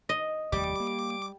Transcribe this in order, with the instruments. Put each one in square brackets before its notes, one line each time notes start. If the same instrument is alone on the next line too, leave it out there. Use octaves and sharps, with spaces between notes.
[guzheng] D#5
[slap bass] F1 D#2 A3 [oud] G3 [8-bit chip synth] D6
[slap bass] A#3